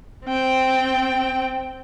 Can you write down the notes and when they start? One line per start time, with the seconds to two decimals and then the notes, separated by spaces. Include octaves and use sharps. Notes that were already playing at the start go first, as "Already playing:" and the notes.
0.25 C4 G5